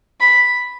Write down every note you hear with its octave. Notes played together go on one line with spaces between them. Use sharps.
B5